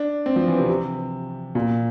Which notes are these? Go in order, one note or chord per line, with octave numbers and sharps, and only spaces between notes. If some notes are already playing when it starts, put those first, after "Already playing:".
Already playing: D4
C4
F3
E3
C3
C3
A#2